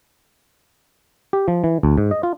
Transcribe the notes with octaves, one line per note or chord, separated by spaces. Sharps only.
G4
F3
E3
D2
G#2
D#5
F4